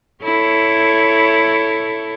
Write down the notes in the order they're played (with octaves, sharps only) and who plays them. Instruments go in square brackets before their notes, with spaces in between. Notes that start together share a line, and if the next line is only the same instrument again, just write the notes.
[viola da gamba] E4 A4 C#5